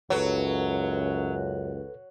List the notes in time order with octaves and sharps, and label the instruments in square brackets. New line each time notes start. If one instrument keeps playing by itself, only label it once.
[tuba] C#2 [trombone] F#2 [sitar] F#3 [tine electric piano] A4 B4 C#5